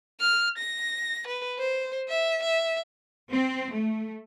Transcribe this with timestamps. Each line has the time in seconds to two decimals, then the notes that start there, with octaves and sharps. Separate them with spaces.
0.20 F6
0.58 A#6
1.27 B4
1.59 C5
2.08 E5
2.43 E5
3.32 C4
3.73 A3